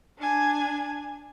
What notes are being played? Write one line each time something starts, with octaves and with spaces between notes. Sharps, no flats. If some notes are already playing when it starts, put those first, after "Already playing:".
D4 G#5